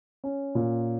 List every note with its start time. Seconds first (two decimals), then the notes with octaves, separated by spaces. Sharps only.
0.24 C#4
0.55 A#2